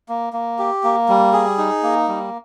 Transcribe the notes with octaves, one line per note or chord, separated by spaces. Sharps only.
A#3
A#3
G4
A#3
G3
G#4
D#4
A#3
G3